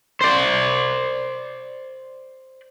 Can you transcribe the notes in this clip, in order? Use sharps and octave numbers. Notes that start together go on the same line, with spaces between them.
C5 D5